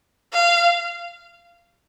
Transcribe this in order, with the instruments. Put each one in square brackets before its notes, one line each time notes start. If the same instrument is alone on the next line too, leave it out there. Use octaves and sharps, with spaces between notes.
[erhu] F5